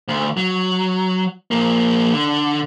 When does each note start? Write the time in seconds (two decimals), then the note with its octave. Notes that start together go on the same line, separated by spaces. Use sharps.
0.08 D2
0.37 F#3
1.51 F3 A#3
2.13 D3